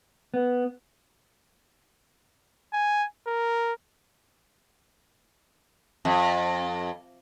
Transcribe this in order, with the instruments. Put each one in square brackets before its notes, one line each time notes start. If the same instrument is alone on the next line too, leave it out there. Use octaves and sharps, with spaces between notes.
[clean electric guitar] B3
[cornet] G#5
A#4
[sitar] F2